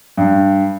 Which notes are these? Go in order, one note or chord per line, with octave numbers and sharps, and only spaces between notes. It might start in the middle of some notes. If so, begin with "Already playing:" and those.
G2